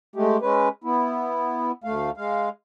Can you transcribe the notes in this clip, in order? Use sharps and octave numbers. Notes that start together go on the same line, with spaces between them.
G#3 A3 G4
G#3 C#4 B4
B3 E4
D2 A3 F5
G#3 F5